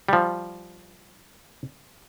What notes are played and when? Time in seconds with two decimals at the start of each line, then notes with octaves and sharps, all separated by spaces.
0.09 F3 G3